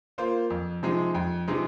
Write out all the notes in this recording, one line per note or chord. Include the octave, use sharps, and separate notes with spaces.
A#3 F4 C5
F2
C3 F3 G#3 D#4
F2
C3 F3 G#3 D#4